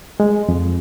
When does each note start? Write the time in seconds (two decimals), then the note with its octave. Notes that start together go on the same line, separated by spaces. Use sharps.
0.20 G#3
0.49 F2